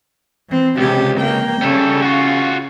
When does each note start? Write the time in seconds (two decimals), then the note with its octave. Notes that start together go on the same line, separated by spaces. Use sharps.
0.49 E3 C4
0.78 C#2 C3 G4
1.20 A#3 G5
1.62 C#3 G3 A4
2.02 F4 F#4